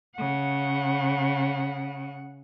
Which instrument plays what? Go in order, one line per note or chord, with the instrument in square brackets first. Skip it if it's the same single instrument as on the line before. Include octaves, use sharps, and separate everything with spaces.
[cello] C#3 F#5